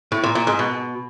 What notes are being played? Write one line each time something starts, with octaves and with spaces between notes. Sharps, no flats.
A2
A#2
A#2
G#2
B2